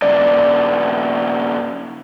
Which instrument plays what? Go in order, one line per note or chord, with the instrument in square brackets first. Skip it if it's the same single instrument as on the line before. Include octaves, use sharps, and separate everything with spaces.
[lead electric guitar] G2 C#3 [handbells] D5